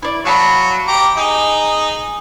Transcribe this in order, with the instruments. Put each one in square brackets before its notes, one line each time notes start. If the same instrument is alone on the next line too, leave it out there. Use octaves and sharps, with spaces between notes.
[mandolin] E4 D5
[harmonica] F#3 C#6 [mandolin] F5 A5 B5
[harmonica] G4 A#5 D6
D#4 G#4